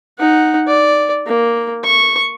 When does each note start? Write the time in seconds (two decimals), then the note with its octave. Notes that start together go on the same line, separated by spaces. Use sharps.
0.19 D#4 F#5
0.67 D5
1.27 A#3
1.84 C#6